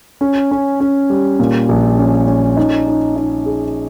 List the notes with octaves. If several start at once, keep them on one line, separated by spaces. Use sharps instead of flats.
C#4
C#4
C#4
G3
A#2
A#1
C#4
C#4
D#4
D#4
D#4
G#4